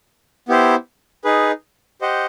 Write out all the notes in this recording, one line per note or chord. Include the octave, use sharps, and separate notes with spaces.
B3 E4 G4 C5
D#4 G#4 B4
G4 C5 D#5 F#5